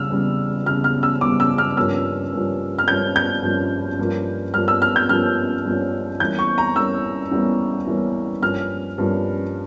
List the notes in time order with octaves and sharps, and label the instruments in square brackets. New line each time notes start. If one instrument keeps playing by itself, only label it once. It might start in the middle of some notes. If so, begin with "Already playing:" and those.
Already playing: [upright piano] C#3 G3 E6 F6
E2 C#3 G3
E2 C#3 G3 F6
F6
E6
E2 C#3 G3 D6
E6
F6
G2 F3 A#3 C#4 E6
G2 F3 A#3 C#4
F6
G2 F3 A#3 C#4 G6
G6
G2 F3 A#3 C#4
G2 F3 A#3 C#4
G2 F3 A#3 C#4 F6
E6
F6
G6
G2 F3 A#3 C#4 F6
G2 F3 A#3 C#4
E2 E3 G3 A#3 C#4 G6
C#6
A#5
E2 E3 G3 A#3 C#4 E6
E2 E3 G3 A#3 C#4
E2 E3 G3 A#3 C#4
G2 F3 A#3 C#4 F6
G2 F3 A#3 C#4